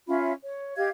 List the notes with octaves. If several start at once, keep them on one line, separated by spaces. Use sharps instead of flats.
C#4 F4 E5 B5
C#5
G4 D#5 F5 G#6